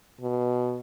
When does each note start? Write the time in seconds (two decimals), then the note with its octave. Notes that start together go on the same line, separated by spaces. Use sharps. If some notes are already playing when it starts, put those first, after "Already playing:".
0.21 B2